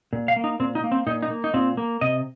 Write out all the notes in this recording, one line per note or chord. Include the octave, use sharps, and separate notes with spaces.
A#2
F5
A#3
D#4
A#2 C4
D#4
A#3
C4
A#2 D#4
D#4
A#3
D#4
A#2 C4
A#3
C3 D#5